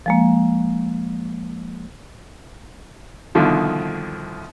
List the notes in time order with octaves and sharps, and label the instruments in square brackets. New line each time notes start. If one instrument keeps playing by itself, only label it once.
[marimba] F3 G#3 A#3
[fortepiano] C2 B2 D3 D#3 F3